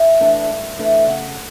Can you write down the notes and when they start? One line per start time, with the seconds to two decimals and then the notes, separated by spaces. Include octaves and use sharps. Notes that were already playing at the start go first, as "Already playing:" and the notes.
Already playing: E5
0.20 E3 A3 D4
0.49 G2
0.79 E3 A3 D4
1.07 C#3 F#5